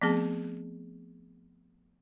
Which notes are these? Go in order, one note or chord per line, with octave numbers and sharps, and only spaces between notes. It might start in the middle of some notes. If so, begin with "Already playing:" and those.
F3 A3 B3 C4 G#4